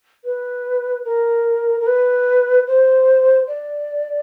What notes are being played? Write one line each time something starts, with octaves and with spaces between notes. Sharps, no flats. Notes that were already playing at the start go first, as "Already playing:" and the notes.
B4
A#4
A#4
B4
C5
D5